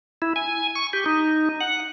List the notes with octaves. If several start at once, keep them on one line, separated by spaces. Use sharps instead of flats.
E4
G#5
C#6
G4
D#4
F#5